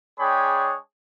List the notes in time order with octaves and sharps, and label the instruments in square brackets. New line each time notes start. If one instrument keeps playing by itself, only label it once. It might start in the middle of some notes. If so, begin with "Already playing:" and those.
[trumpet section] G#3 D4 G#4 C#5 G5 B5